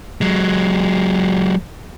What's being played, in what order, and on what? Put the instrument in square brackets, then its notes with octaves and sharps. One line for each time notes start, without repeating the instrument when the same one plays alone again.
[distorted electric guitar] F#3 G#3